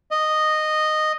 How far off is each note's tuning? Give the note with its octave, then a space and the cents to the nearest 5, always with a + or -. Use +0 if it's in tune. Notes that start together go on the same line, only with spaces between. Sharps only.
D#5 -10